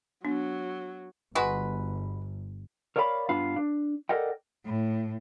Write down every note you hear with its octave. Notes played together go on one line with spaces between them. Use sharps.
F#3 B3 D4
G1 G#3 F#4 B4
A#4 C#5 D5 F5 G5 B5
G2 B3 D4 F4 F5 B5
D4
A4 A#4 D5 D#5 F#5 G5
A2